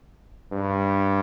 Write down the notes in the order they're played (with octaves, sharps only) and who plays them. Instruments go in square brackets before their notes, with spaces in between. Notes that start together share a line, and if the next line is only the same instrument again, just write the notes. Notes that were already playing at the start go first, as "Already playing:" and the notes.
[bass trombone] G2